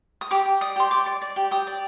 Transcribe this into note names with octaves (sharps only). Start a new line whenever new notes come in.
D#6
G4 D6
G4
D5 D#6
G4 C6
D5 D6
D5
D5
G4
G4 D#6
D5